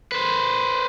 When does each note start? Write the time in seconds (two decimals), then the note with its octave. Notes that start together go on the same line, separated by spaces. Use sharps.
0.12 B4 C5